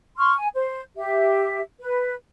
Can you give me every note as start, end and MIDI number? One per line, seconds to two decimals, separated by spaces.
0.18 0.35 84
0.18 0.35 85
0.18 0.35 89
0.35 0.48 80
0.54 0.80 72
0.97 1.60 67
0.97 1.60 76
1.80 2.14 71